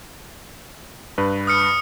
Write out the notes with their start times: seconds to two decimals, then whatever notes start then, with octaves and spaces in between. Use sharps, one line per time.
1.18 G2 B4
1.47 D#6 F6 C#7